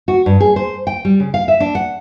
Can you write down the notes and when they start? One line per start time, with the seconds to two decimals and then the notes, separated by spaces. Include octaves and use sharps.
0.08 F#4
0.26 G2
0.40 G#4
0.56 C5
0.87 G5
1.05 G3
1.20 C#3
1.34 F5
1.48 E5
1.60 D4
1.75 F#5